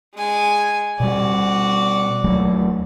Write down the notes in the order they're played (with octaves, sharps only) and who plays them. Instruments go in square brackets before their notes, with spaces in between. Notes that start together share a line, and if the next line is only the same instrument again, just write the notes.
[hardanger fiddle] G#3 G#5
[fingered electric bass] B2 G3 [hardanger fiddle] F#4 D5
[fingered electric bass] D#2 F#3 A3